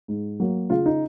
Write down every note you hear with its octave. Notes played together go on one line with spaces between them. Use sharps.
G#2
F#3 A#3
C#3 F4
D#4